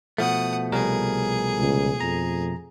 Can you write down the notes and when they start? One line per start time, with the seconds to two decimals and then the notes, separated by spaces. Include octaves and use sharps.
0.18 B2 F3 A3 F#5 D#6
0.72 C2 G3 G#4 A#4
1.59 C#2
2.00 F2 A#5